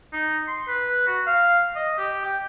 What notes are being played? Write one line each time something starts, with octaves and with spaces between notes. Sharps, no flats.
D#4
C6
B4
F#4
F5
D#5
G4
G5